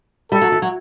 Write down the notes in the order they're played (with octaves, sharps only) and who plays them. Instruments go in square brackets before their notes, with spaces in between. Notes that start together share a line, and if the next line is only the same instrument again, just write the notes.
[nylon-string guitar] G3 [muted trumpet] A4
[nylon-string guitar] F#3
E3
F#3